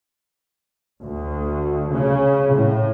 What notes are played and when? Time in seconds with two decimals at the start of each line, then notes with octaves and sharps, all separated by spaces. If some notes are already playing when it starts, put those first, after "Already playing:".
1.03 D2
1.93 C#3
2.53 A2